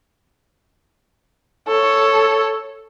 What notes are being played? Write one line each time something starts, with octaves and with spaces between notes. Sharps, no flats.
A4 C#5